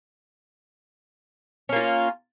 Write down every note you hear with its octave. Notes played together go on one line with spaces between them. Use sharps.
A#3 C#4 F4